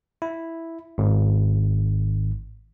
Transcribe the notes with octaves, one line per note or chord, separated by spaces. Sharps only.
E4
G#1